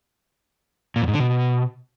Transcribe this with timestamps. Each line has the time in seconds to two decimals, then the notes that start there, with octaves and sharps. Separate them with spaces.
0.96 A#2
1.02 F2
1.08 G#2
1.14 D3
1.20 B2